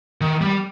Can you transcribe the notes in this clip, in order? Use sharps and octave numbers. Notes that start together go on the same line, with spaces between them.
D#3
G3